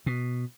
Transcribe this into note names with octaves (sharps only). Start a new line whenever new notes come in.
B2